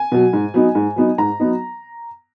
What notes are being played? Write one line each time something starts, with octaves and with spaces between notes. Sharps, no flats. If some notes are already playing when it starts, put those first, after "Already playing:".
Already playing: G#5
B2 F#3
G#2
F#3 B3 D#4
G#2
F#3 B3 D#4
G#2 A#5
F#3 B3 D#4